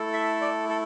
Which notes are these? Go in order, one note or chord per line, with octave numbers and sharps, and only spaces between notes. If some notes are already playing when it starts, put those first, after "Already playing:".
Already playing: A3 E4 A4
E5
D5
A4